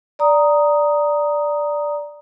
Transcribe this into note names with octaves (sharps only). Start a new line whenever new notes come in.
D5 A#5 D#6